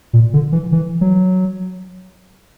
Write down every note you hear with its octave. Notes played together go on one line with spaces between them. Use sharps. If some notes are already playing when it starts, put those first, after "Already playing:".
A#2
D3
E3
E3
F#3